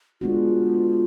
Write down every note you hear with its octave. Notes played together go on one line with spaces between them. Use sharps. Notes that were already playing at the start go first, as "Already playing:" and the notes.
G#3 B3 D4 F4 F#4